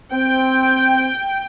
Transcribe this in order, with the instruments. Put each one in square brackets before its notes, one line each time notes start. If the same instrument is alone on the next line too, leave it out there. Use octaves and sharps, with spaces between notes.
[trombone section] C4 [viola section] G5